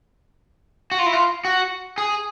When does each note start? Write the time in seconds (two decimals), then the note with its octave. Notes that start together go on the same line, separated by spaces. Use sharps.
0.91 F#4
0.99 F4
1.06 E4
1.13 F4
1.45 F#4
1.98 G#4